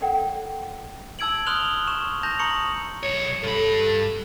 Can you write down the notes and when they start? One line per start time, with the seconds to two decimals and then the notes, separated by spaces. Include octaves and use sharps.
0.01 A4 A#4 D5 F#5 G5
1.19 A5 E6 G#6 D7 F#7
1.46 C6 D#6 F6 F#6 F7 G7
1.88 C#6 E7
2.23 A5 G6 A#6 F7
2.39 A5 A#5 C#6 D#6 C#7 F#7
3.03 B1 C#5
3.43 G2 A4 B5